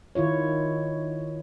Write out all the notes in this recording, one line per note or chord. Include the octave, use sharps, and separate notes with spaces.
D#3 E4 F4 C#5